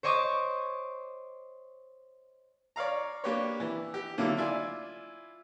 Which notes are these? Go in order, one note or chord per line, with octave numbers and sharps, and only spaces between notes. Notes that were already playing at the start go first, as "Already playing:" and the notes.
C5 C#5 D#5 C#6 D6
C#5 D5 F5 A#5
A#3 D4 G4 B4 C#5
E3
G4
D3 D#3 F#3 A3 A#3 E4
E4 F4 D5 E5 G#5